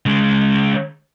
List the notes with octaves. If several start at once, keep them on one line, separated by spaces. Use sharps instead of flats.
C#3 G#3